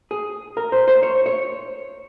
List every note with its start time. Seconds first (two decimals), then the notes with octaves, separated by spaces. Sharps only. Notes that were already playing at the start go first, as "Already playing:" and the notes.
0.11 G#4
0.57 A#4
0.72 C5
0.88 C5
1.03 C#5
1.26 C#5